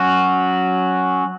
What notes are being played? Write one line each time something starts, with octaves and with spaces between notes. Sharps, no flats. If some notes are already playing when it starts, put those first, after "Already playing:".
Already playing: F#3 C#4 F#4